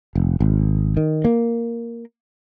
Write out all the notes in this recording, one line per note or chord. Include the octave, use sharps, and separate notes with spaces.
F1
G#1
D#3
A#3